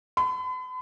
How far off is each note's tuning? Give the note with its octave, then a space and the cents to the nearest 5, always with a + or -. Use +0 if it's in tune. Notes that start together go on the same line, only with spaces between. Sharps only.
B5 +45